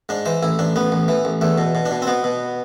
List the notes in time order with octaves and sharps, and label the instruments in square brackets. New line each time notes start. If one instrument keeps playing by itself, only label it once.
[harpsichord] G#2 D4
E3 C5
A1 E4
A1 D4
A1 B3
A1
E3
A1
E2 A3
B2
B2
D4
B2
C4
B2 B3
B2